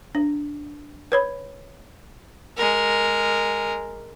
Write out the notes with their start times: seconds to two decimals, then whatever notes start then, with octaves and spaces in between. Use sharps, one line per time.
0.15 D4
1.12 B4 C#5 B5
2.57 G#3 A#4